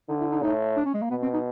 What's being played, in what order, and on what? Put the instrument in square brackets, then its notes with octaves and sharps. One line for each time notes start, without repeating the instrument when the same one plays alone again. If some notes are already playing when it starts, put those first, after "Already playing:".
[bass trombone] D3 [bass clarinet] D#4
[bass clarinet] E4
D#4
[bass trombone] A2 [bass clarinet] D#4
[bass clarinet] D4
C#4
G#3
A#3
[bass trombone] B2 [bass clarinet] B3
[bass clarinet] C4
D#4